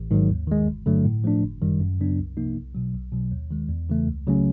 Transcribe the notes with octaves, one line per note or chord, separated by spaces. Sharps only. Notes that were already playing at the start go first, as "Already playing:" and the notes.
Already playing: A1
G#2 D#3 F#3
D#2
D#3 G#3
G1
G2 D3 F#3 A3
A2
F3 A3 D4
G1
F#2 D#3 G3
F#2
C#3 F#3 B3 D4
C2
C3 F3 A#3 D#4
B1
B2 F#3
B1
B2 F#3
D#2
D#3 G#3
E2
C#3 E3 A3
C#2
C#3 F#3 A3 C#4